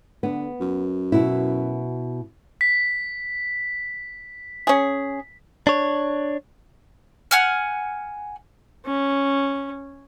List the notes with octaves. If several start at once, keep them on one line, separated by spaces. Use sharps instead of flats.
D3 B3
F#2
B2 E4
B6
C#4 G#4
D4 C#5
F#5 G#5 F6
C#4